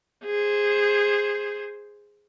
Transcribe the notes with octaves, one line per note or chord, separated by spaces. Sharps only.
G#4 C5